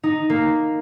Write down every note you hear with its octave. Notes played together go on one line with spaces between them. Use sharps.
D#4
A#3